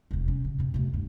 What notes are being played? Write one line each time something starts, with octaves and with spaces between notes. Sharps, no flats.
E1 C2
C#4
C#3
F2 C3
F#3 A3
G2